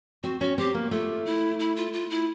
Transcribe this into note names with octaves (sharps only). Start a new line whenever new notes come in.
C4 F#4
C#4 F#4
C4 G4
A#3
A3 F4
E4
E4
F4
F4
E4